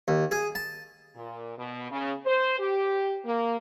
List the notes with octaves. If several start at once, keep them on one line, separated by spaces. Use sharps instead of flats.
D#2
G#4
A5
A#2
B2
C#3
C5
G4
A#3